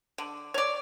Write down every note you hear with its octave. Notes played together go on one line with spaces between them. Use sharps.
D3
C#5 D5